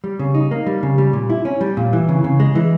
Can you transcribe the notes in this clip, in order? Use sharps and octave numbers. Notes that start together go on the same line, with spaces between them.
G3
C#3
D#4
A#3
G3
C#3
G3
A#2
E4
C#4
G3
A#2
E3
C#3
C#3
G#3
E3